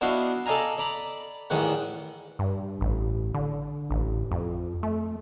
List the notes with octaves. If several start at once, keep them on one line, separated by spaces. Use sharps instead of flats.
B3 D4 E4 F#4 D#5 F5
A4 D5 D#5 F5 G#5 A#5
D5 A#5 B5
A1 E2 G#2 D#3 F#5
G2
A1
D3
A1
F2
A3